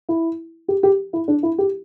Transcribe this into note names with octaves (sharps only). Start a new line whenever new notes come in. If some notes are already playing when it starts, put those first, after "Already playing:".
E4
G4
G4
E4
D4
E4
G4